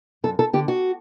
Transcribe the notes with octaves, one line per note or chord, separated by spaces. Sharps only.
F#2 A4
A4
D3 G4
F#4